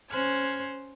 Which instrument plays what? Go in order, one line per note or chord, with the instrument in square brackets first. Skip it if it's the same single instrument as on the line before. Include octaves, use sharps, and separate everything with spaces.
[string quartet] C#4 C5 F6 F#6 G#6